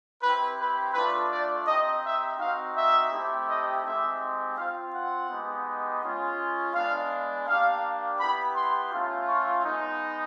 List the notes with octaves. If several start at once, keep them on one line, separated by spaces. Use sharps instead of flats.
C4 E4 G4 B4
B4
A3 D4 F4 B4
D5
C4 D#4 G4 D#5
E5
C4 D#4 F#4 F5
E5
A3 C4 E4 G4
D#5
G#3 C4 D#4 G4 E5
C4 F4 F5
F#5
G#3 B3 D#4 G4
G#3 C#4 F4
G#3 B3 D4 F5
A#3 D4 G4 F5
B3 E4 G4 B5
C6
A3 C#4 F4
C#6
G#3 B3 D#4